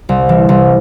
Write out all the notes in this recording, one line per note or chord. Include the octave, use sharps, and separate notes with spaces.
C2
E3
C2